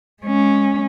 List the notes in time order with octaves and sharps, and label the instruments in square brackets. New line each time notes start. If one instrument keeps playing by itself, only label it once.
[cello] G#3 C#4